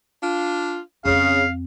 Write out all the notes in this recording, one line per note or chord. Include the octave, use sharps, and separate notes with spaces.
D4 F4
F2 C#3 C4 F5